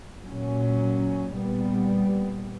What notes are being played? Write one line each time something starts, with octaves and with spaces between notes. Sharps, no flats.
A#2 F#3 C#4
A#2 G3 B3